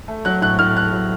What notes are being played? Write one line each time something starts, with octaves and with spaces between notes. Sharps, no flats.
A3
F#3 F#6
A2 F#6
A2 F6
A3 F#6
F#3